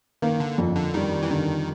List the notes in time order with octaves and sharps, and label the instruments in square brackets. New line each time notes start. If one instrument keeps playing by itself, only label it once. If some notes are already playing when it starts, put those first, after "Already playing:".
[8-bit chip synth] D#3 [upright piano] A#3
[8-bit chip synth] D3
[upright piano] F2
[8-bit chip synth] D3
[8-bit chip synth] D#3 [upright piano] G3
[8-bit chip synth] E3
[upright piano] D3 [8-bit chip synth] D#3